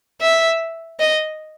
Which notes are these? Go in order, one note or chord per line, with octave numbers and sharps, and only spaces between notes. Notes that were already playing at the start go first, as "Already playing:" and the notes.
E5
D#5